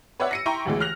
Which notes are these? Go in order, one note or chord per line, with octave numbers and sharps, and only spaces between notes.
B4 C#5 D5 E5 F#5 E6
A#6 C#7 D#7
E4 G5 A#5 C6 C#6
A1 D2 E3 G#3
F6 F#6 A#6 F7